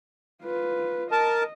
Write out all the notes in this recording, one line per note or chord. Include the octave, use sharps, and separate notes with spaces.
F4 B4
A#4 D#5 A5